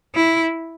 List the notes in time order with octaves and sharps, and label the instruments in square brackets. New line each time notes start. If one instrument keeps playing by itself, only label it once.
[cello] E4